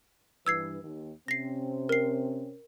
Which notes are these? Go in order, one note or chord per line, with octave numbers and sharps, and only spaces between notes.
G2 E3 B4 E6 G#6 C7
D#2
C3 C4 C#4 A#6 C7
A#4 C7